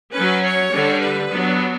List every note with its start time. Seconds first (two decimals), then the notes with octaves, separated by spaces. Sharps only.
0.14 F#3 C#4 B4
0.43 C#5
0.72 D3 G3 D4
1.01 B4
1.30 F#3 B3 D4